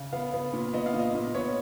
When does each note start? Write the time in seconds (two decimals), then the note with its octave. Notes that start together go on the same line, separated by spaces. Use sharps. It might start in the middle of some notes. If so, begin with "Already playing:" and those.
Already playing: C#3
0.13 B3 F5
0.33 B3
0.53 A#2
0.74 B3 D#5
0.86 F5
0.94 A#2
0.99 D#5
1.15 A#2
1.35 B3 C#5